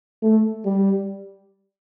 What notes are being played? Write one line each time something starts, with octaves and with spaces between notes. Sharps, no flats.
A3
G3